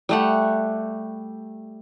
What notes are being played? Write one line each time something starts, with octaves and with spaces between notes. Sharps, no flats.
G3 A3 F#5